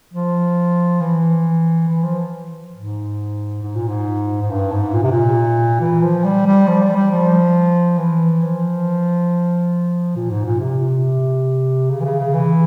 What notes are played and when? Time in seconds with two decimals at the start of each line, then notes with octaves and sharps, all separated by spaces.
0.14 F3
1.01 E3
1.88 E3
2.03 F3
2.75 G#2
3.62 G#2
3.75 A#2
3.88 G#2
4.41 G#2
4.50 G2
4.72 G#2
4.93 A#2
5.03 C3
5.11 A#2
5.81 E3
6.02 F3
6.24 G3
6.46 G3
6.67 F3
6.82 G3
6.96 G3
7.11 F3
7.98 E3
8.42 F3
10.16 A#2
10.30 G#2
10.45 A#2
10.60 C3
11.90 C#3
12.00 E3
12.05 C#3
12.19 C#3
12.34 E3